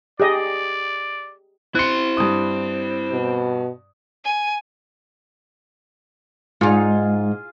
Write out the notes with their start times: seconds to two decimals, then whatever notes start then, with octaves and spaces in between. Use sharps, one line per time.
0.20 G4 G#4 D5 D#5
1.75 C4 E4 C6 F#6 C#7
2.17 G2 D#6
3.12 B2
4.24 G#5
6.61 G#2 G#3 D#4 F4 G#4